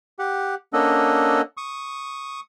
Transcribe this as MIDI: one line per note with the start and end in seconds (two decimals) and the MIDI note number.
0.19 0.55 67
0.19 0.55 78
0.73 1.41 58
0.73 1.41 61
0.73 1.41 62
0.73 1.41 69
0.73 1.41 75
0.73 1.41 78
1.57 2.40 85
1.57 2.40 87